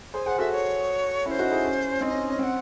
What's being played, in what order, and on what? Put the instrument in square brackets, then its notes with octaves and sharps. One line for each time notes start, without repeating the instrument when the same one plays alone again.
[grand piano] G#4 C5 [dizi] G#5
[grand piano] G#4 C5 [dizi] F#5
[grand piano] F#4 A4 [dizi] E5
[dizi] C#5
[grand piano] C#4 E4 [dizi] C5 C#5
[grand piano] D#4 F#4
E4 G#4
C#4
C#4
[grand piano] C4 D#4 [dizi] D#5
[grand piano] C#4
C#4
[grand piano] C4 [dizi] F#5 G#5